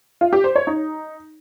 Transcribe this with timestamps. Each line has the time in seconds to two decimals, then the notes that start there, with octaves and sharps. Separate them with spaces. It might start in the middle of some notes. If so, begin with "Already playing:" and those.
0.21 F4
0.33 G4
0.44 C5
0.56 C#5
0.67 D#4